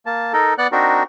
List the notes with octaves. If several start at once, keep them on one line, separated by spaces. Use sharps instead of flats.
A#3 A5
D#4 A4 A#4
B3 D5 F#5 F#6
C4 D4 D#4 F#4 A#4